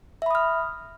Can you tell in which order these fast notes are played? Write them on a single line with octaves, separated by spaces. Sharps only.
E5 B5 D#6 F6